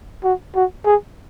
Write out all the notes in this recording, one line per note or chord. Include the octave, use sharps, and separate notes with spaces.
F#4
F#4
G#4